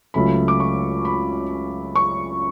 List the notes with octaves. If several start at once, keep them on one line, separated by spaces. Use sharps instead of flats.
C#2 C#3 F#3 A3 B5
D6
C#6
B5
C#6